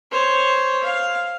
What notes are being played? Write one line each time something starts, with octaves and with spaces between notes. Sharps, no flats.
C5 C#5
F5